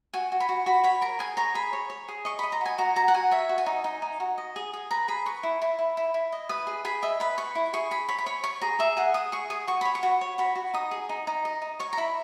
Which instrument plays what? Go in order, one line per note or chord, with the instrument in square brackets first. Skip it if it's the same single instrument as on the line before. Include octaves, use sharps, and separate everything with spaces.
[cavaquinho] F#4 G#5
F#4
B5
F#4
F#4 B5
C#5 B5
A#4 A#5
G#4 G#5
C#5 A#5
G#4 B5
C#5
C#5
G#4
D#5 C#6
D#5 B5
A#5
F#4 G#5
F#4 A#5
F#4 A#5
F#5
F#4 G#5
C#5 E5
F#4
G#5
D#4
D#4
D#4
F#4
D#5
G#4
G#4
B4 A#5
G#4 B5
B4 C#6
E4
E4
E4
E4
E4
D#5
B4 D#6
G#4
G#4 B5
D#5 E5
B4 B5
B4 C#6
E4
G#4 C#6
G#4 B5
C#5 B5
B5
C#5 C#6
C#5 C#6
G#4 A#5
G#4 E5
G#4 F#5
G#4 D#6
G#4 C#6
G#4 D#6
F#4 C#6
C#5 B5
C#6
F#4
C#5
F#4 B5
F#4
D#4 D#6
G#4
D#4
D#4
D#5
D#4
C#5 C#6
A#5
E4 B5